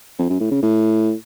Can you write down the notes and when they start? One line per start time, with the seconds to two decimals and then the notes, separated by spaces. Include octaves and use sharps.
0.18 F2
0.29 F#2
0.40 A2
0.51 C#3
0.62 A2